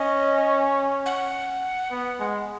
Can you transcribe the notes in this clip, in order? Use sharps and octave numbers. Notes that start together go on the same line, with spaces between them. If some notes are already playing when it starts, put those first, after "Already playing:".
Already playing: C#4 D#5
F#5
B3
G#3